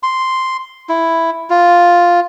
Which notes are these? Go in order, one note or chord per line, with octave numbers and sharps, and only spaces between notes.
C6
E4
F4